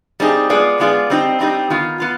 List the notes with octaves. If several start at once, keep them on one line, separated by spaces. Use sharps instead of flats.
G3 C4 D#4 G#4
G#3 B3 F4 G#4 D5
G#3 B3 F4 G#4 D5
G3 C4 D#4 G4
G3 C4 D#4 G4
D#3 B3 F4
B3 F4